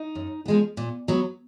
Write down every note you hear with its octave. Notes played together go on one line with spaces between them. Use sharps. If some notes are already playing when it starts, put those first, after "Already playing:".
Already playing: D#4
F#2
F3 G#3 B3
A#2
F#3 B3